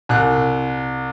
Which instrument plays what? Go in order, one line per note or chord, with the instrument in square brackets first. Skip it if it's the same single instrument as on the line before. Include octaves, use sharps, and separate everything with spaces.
[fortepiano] C2 F#6